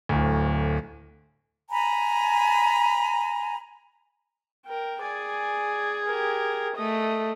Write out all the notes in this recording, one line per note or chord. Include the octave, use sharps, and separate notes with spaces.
D1 D2
G#5 A#5 B5
A#4 G5
G#4 D5 G#5
G4 A#4
A3 D#5 D#6